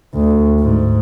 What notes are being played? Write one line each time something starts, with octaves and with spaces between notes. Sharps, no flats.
D2
G#2